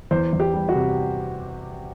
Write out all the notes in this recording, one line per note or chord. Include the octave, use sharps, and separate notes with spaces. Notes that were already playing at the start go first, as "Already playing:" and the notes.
E2 C5
E2
G4
G3
F#4
C3